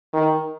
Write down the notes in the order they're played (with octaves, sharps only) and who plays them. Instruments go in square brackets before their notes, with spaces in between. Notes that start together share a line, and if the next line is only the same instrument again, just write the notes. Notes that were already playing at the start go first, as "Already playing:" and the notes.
[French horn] D#3